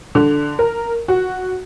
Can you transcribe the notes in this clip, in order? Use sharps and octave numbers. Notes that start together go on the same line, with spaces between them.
D3
A#4
F#4